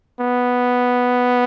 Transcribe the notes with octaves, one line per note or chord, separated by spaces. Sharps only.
B3